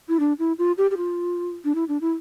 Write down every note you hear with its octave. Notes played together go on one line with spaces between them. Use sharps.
E4
D4
E4
F4
G4
G4
F4
D4
E4
D4
E4